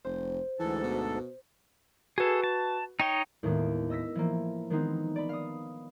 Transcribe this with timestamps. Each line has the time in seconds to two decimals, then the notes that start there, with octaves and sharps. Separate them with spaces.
0.05 F1 C5
0.59 D2 G#2 E3 A4
0.83 B2
2.18 F#4 G#4 A4 B4
2.44 A5
3.00 D#4 C#5 D#5 G5
3.43 D#2 A2 D#3 G#3 B3
3.90 D#5 E6 A#6 B6
4.15 E3 F3 A#3
4.70 D#3 G#3 B3 C4 D#4
5.16 D5 B5
5.29 F5 D#6